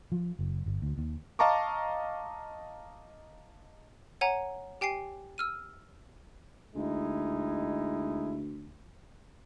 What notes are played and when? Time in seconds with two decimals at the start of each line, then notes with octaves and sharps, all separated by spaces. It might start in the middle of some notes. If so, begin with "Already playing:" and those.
0.12 F3
0.39 F#1
0.66 G1
0.82 D2
0.98 D#2
1.39 D#5 F5 A5 A#5 C#6 D6
4.21 C#5 F#5 G#5 A#5
4.81 G4 G5 G#5 C7
5.38 E6 F6 D#7
6.76 D2 G#3 D#4 E4